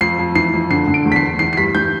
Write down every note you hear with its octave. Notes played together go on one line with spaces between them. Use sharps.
F2 C7
F2
E3 C7
F2
D3 C7
D3
D7
E2
B6
C7
E2
E3 C7
C7
G2 B6
E3 G6